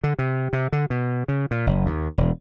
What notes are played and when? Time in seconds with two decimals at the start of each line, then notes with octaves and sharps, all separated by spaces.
0.04 D3
0.19 C3
0.53 C3
0.72 D3
0.90 B2
1.28 C#3
1.51 A#2
1.67 F#1
1.86 D#2
2.18 E1